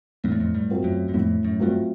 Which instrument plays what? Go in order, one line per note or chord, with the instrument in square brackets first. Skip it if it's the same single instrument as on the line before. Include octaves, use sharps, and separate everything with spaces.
[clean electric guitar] F2 [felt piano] A2
[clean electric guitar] E2
F2
G2
[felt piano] F#3 A3 C4 F4
[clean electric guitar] F#2
F#2
[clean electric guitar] F2 [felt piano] A2
[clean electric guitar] F#2
[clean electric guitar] G2 [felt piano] F#3 A3 C4 F4